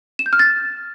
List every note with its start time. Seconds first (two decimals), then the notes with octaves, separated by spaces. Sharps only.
0.19 E7
0.26 G6
0.33 F6
0.39 A6